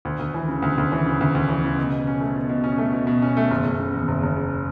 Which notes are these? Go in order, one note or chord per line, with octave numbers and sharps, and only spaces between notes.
D2
D2
E3
C#3
D2
D2
E3
C#3
D2
D2
E3
C#3
B2
B2
C#4
A3
B2
B2
C#4
A3
B2
B2
C#4
A3
F#1
F#1
C#3
E2
F#1
F#1
C#3